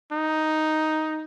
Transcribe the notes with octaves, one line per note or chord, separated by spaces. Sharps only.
D#4